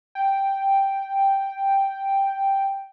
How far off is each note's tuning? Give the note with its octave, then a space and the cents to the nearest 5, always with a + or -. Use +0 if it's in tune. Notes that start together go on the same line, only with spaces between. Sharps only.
G5 +0